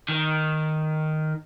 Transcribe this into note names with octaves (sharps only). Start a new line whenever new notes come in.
D#3